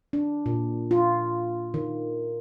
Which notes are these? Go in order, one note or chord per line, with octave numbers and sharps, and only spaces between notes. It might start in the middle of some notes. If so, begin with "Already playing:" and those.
D4
A#2
F4
D#3